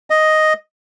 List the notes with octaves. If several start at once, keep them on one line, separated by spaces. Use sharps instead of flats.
D#5